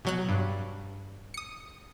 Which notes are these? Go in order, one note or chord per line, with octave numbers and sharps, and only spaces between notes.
B2 F#3 F#6
G2
D#6 C#7